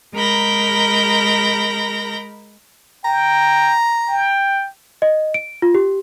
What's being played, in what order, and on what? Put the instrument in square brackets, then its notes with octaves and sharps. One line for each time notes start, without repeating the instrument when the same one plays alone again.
[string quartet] G#3 A#4 A#5 B5 G6 A#6
[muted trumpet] G5 [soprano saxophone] A#5
[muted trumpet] G5
[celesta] D#5
D7
F4
G4